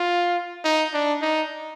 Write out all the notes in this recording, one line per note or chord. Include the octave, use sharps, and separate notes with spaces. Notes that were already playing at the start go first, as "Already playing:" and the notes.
Already playing: F4
D#4
D4
D#4